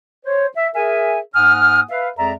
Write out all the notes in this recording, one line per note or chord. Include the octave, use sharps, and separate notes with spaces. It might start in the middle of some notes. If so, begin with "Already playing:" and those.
C5 C#5
E5
G#4 A#4 E5 G#5
G#2 A#3 F#5 G#5 D#6 F6
B4 E5 F5
F2 G#3 G#4 D5 E5 A#5